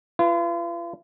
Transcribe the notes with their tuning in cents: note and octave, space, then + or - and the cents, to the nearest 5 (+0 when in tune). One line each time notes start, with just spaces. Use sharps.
F4 -40 B4 +0